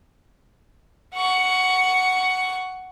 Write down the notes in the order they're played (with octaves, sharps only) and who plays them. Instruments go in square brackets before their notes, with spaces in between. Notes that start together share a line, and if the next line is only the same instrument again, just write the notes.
[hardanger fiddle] F#5 C#6